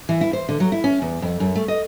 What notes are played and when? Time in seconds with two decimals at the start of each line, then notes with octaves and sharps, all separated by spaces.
0.09 E3
0.21 E4
0.33 C5
0.49 D3
0.60 F#3
0.72 E4
0.84 C#4
1.02 E2
1.22 F2
1.40 F#2
1.55 A3
1.68 D#5